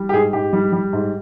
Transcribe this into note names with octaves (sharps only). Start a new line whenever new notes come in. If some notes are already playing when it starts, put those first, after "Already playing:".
Already playing: G3
G4
G#2 G#4
G#2 G4
G3
G3
G#2